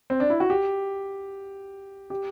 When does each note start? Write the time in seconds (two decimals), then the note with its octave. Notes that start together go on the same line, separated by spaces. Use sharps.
0.10 C4
0.20 D4
0.30 E4
0.40 F#4
0.50 G4
2.10 G4